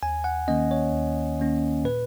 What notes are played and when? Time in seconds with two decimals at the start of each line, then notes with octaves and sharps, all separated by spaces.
0.03 D#2 G#5
0.24 F#5
0.48 D#3 A#3 C#4 D#5
0.71 C#5
0.93 D#2
1.39 D#3 A#3 C#4
1.84 A#2 B4